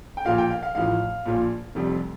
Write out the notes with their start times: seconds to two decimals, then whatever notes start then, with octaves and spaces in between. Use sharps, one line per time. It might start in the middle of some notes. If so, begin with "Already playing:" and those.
0.17 G5
0.25 A#1 A#2 F3 A#3 F5
0.38 G5
0.50 F5
0.63 F5
0.75 A1 A2 F3 F5
1.26 A#1 A#2 F3
1.75 F1 F2 C3 G3